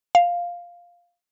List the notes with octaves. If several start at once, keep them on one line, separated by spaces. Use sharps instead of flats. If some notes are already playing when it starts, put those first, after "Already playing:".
F5